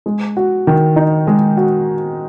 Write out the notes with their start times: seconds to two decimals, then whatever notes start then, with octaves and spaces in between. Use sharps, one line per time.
0.06 G#3
0.37 F#4
0.67 D#3
0.96 D#4
1.27 G#3
1.57 F#4